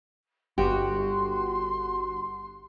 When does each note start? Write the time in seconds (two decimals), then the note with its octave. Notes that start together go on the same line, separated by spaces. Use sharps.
0.58 G1 F#4 G4 C6